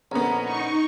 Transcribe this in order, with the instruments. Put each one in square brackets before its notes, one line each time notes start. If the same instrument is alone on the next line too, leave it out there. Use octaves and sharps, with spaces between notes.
[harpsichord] A#1 D3 [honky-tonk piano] B3 C#4 [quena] A#5
[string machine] D#4 C#6